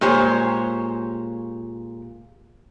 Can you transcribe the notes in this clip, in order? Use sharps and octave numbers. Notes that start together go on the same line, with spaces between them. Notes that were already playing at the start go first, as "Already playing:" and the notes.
A#2 G#3 G4 C5 C#5